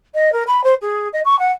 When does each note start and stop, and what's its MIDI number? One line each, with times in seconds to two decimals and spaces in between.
0.14 0.32 75
0.32 0.43 70
0.46 0.63 83
0.63 0.74 72
0.81 1.08 68
1.12 1.20 75
1.24 1.37 85
1.38 1.51 78